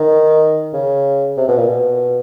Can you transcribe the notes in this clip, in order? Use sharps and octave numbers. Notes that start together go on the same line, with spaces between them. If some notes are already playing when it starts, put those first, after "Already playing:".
Already playing: D#3
C#3
C3
B2
A#2
B2